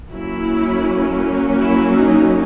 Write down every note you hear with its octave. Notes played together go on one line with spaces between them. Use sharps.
F#3 A#3 C#4 E4
E4
D#4